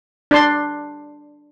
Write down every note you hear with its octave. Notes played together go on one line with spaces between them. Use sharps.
D4 D5 C6